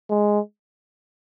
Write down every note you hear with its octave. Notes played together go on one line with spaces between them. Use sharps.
G#3